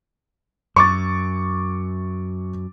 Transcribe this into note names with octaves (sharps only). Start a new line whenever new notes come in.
F#2 C#6 D6 A6